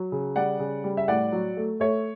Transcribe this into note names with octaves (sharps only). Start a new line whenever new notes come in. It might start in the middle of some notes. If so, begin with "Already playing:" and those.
Already playing: F#3
C#3
G3 D5 F#5
C#3
G3
E5
A2 D5 F#5
F#3
A3
A3 C#5 E5